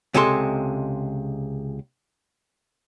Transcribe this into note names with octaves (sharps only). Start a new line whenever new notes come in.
C#2 C3 G#3 G#4 A4 C6